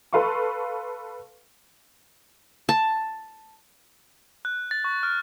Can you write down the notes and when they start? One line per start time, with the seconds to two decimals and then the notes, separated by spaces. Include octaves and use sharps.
0.13 A4 B4 F5 C6 C#6
2.69 A5
4.45 F#6
4.71 A6
4.84 C#6
5.03 F6